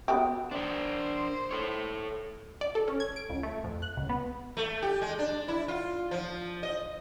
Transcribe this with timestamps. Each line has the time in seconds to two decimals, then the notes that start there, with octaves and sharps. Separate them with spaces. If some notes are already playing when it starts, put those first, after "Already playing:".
0.08 B3 F#4 G4
0.51 D4 A#4 C5
1.51 A4 C#5
2.61 D5
2.75 A4
2.88 C#4
3.00 G#6
3.16 D7
3.30 C#2
3.43 A3
3.64 F2
3.82 F#6
3.97 C#2
4.09 B3
4.57 A3
4.82 G4
5.01 G#3
5.19 D4
5.48 E4
5.68 F4
6.11 F3
6.63 D#5